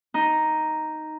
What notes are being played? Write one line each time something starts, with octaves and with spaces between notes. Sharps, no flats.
D#4